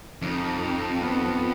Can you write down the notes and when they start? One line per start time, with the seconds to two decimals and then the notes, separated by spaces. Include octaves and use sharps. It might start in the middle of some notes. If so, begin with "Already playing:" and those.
0.22 F2 D#4
0.99 B3